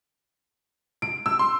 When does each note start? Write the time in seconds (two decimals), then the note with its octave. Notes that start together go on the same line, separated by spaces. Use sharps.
1.02 D7
1.26 E6
1.39 C6